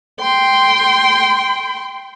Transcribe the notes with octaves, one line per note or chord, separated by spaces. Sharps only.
G5 C6